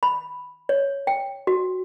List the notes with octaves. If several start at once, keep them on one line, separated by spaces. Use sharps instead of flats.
B5
C#5
G5
F#4